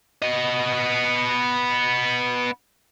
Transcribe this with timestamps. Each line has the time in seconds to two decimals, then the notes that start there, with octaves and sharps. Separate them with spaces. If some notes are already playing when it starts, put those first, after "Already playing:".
0.22 B3 D#5